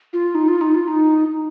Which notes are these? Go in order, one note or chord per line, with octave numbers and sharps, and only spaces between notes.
F4
D#4
F4
D#4
F4
D#4